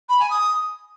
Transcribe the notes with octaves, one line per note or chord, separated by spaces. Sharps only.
B5
G#5
D#6